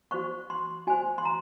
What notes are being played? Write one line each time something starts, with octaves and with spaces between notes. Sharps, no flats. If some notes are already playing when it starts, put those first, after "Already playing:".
F#4 C5 C#6
C6
F#4 C5 G#5
C6
A#5